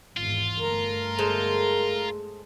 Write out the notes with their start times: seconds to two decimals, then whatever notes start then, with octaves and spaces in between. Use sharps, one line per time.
0.17 G#1 E2 G#2 F4
0.59 G1 A3 A#4
1.18 G#3 A4 C5